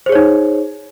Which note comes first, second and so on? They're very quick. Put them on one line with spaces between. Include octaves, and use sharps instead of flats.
C5 G#4 C#5 D#4